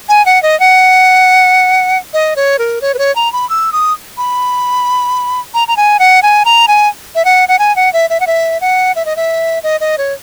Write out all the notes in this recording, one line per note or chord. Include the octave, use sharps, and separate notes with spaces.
G#5
F#5
D#5
F#5
D#5
C#5
A#4
C#5
B4
C#5
A#5
B5
E6
D#6
B5
A#5
A#5
G#5
F#5
G#5
A#5
G#5
E5
F#5
F#5
G#5
F#5
E5
E5
F#5
E5
F#5
E5
D#5
E5
D#5
D#5
C#5